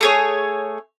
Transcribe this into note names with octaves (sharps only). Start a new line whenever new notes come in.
A3 G#4 C#5